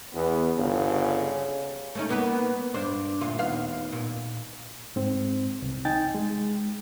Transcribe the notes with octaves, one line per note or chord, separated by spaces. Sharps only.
E2 B3
G1 C#3
A3 C#4 D#4
A#3 B3 B4
G2 D4 C5
D2 A#2 F4
D#2 B3 F5
A#2
G#2 C4
C2
D#4 G5 G#5 A6
G#3